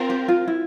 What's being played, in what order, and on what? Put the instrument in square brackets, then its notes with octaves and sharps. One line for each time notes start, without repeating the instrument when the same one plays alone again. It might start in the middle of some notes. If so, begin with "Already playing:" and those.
Already playing: [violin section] C4 F4 A#4
[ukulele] G4
F4
E4